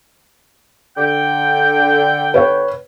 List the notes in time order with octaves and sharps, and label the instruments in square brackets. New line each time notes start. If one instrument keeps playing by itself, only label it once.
[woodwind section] D3 G5
[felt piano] B4 C#5